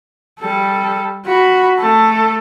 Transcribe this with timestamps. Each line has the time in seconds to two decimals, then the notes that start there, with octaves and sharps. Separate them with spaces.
0.40 G3 A4
1.25 F#4 B5
1.79 A3 A4